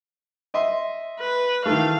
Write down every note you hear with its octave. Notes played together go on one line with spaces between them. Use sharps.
D#5 E5 C6
B4
D#3 E3 A3 F5